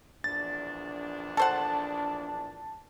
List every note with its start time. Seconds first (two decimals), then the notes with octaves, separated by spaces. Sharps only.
0.24 A#1 E2 D4 A6
1.37 A4 C5 F#5 A5